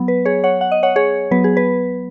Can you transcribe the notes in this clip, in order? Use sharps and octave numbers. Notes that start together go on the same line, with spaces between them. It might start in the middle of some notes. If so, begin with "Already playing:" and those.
Already playing: F#3 B3
B4
G#4 C#5
C#5 F#5
F#5
D#5
C#5 F#5
G#4 C#5
F#3 B3 B4
G#4
B4